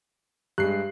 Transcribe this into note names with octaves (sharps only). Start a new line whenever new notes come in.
G2 G#3 G4 F#6 C7